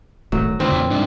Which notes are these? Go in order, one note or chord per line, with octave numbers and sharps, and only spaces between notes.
D1 G#1 F#3 A3
C#2 A#2 D3 C4
E2
C2 G#2 D4